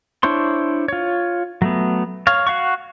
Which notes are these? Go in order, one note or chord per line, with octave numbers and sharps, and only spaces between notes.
D4 E4 C5 C#5 C6
F4 C#5
F#3 A3 B3
C#5 F5
F#4 F5 F#5 C#6